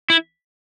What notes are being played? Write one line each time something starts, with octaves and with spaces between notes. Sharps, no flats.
E4